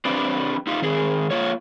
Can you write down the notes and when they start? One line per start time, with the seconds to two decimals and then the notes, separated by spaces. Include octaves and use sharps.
0.05 C4 D4 G4 B4
0.67 D#4 F4 G4
0.82 D#3 C4 G#4
1.31 A#3 F4 C#5